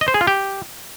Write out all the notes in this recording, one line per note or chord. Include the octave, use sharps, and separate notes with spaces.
D#5
C5
G#4
F4
G4